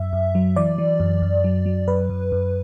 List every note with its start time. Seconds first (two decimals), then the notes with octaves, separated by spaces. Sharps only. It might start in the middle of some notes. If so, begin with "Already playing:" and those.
Already playing: F#2 E5
0.13 F#2
0.35 F#3
0.56 E3 D5
0.78 E3
1.00 F#2
1.22 F#2
1.44 F#3
1.66 F#3
1.88 F#2 B4
2.10 F#2
2.32 F#2